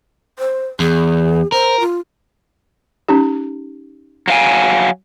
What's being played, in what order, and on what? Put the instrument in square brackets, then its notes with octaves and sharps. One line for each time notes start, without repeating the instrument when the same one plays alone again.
[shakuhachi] C5
[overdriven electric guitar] E2 [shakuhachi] G#4
[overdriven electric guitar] A#4 [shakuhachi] C5
[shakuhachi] F4
[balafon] C#4 D#4 G4
[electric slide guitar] F#3 F5 G#5